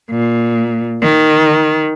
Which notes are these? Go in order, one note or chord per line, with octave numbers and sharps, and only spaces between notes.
A#2
D#3